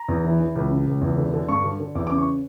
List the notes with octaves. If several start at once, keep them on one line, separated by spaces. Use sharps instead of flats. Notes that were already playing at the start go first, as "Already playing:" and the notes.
Already playing: A#5
E2
E3
E3
C#2
C#3
C#2
E2
D3
D3
G2 C#6
D3
D3
E2 D6
D6
C#3
C#6